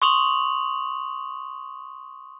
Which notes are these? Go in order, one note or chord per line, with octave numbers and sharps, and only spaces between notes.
C6 C#6 D#6 F7 F#7